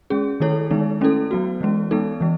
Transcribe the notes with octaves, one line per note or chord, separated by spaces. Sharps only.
G#3 C#4 G#4
D#3 A3 E4 A4 C#5
D#3 G#3 B3 D#4
A3 C#4 E4 A4
F#3 B3 F#4
E3 G#3 C#4
G#3 B3 D#4 A4
E3 G#3